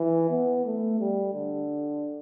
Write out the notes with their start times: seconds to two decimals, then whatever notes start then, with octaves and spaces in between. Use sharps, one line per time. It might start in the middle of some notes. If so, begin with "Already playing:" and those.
Already playing: E3
0.30 B3
0.65 A3
1.00 G3
1.35 D3